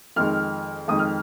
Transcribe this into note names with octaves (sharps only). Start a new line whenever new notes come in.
F2 D#3 G#3 F6
F2 D#3 G#3 D#6
F6